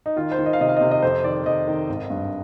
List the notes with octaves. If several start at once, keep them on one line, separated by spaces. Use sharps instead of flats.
D#4
D#3 F4
C5
D#3
D#5
F5
C3 D#5
F5
D#5
C3 F5
D#5
F2 C5
D#3 D5
F2 D#5
D#3
G#1
G2